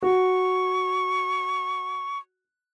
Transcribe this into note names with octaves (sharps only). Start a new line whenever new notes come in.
F#4 C#6